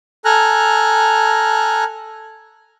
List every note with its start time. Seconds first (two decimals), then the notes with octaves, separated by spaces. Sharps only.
0.25 A4 G#5 A#5 F6 F#6